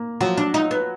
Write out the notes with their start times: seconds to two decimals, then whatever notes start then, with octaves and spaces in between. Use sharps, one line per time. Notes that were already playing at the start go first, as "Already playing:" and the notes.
Already playing: A#3
0.21 F3 F#3
0.38 D4
0.54 D#4 F4
0.71 B3